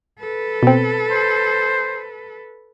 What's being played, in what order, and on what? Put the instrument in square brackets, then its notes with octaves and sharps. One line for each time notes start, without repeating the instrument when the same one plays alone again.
[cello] A4 B4
[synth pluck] B2 C4
[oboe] C5